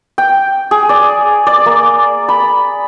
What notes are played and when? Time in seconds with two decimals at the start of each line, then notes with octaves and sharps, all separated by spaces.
0.18 G5
0.71 G#4
0.89 D5
1.47 D5
1.66 A#3
2.29 B5